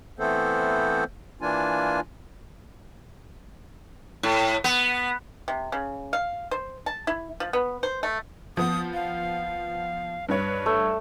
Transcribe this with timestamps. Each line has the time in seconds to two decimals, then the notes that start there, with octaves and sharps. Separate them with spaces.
0.19 E3 A3 B3 C4 A4 C5
1.41 E3 A#3 D4 F4 G#5
4.23 A2
4.64 B3
5.48 C3
5.72 C#3
6.13 F5
6.51 C5
6.86 A5
7.07 E4
7.40 F3
7.53 B3
7.83 C5
8.03 A3
8.57 F3 B3 D#6
8.94 F5
10.29 G2 B4 C#5
10.66 A3